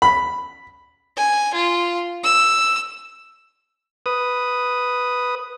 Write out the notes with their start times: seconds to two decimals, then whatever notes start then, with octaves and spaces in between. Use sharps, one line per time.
0.02 B5
1.17 G#5
1.54 F4
2.24 E6
4.06 B4 D#6